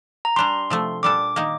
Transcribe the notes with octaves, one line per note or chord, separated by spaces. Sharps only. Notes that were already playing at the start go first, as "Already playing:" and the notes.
A#5
G3 D4 G4 C6
C3 F3 A3
A#2 G3 D4 A4 D6
D#3 A#3 D#4